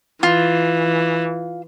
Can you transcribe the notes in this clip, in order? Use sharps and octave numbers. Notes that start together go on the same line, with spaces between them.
E3 F4